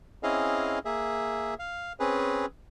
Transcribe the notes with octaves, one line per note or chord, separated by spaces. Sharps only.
C4 C#4 E4 G#4 D#5 F5
A#3 G#4 E5
F5
C4 C#4 G#4 B4